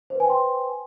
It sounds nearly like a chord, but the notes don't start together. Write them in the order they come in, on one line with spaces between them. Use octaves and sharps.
C5 B4 G#5 G5 C6